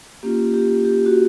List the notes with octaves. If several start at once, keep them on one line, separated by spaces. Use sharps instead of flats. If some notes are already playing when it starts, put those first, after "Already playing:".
A#3 C#4 F4 G4
G4
G4
F#4